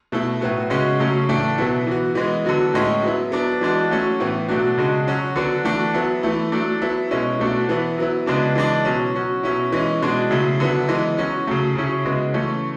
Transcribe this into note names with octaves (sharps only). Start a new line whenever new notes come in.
B2 A3 E4
A2 F#3 B3 F#4
C#3 G#3 C#4 F#4
C#3 F#3 A3 C#4
A2 E3 A3 D4
B2 F#3 B3 E4
E3 B3 F#4
E3 G#3 B3
D3 F#3 B3 F#4
A2 G#3 C#4 E4
F#3 B3 E4
F#3 B3 D4
E3 G#3 D4 F#4
F#3 A3 C#4 F#4
A2 E3 B3 E4
B2 F#3 A3 D4 F#4
C#3 G#3 D4 F#4
F#3 C#4 F#4
D3 F#3 B3 D4 F#4
E3 A3 D4 F#4
F#3 B3 E4
E3 A3 E4
F#3 A3 D4
F#3 B3 E4
B2 G#3 C#4 E4
B2 A3 D4 F#4
E3 B3 E4
F#3 B3 E4
C#3 G#3 B3 D4 F#4
E3 G#3 D4
B2 F#3 C#4
F#3 C#4 F#4
B2 F#3 C#4 E4
E3 G#3 C#4
B2 G#3 D4 F#4
C#3 F#3 A3 E4
D3 F#3 B3 E4
E3 G#3 B3
F#3 C#4 F#4
C#3 F#3 A3
C#3 F#3 C#4 E4
C#3 G#3 B3 F#4
E3 A3 C#4